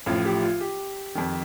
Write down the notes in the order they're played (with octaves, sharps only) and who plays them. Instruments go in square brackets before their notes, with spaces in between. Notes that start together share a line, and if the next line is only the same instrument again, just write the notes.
[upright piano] A1 A2 F3 F4
G4
F4
G4
F2 D#3